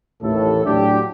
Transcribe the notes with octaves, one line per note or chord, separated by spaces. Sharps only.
A1 D#2 A2 A4
A2 F#3 D4 G4